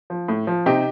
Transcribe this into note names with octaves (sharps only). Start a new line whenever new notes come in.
F3
A2
F3
C3 D#4 G4